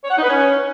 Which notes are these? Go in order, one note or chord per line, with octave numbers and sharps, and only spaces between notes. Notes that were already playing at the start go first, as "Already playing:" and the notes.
C#5
F#5
D#4
B4
C#4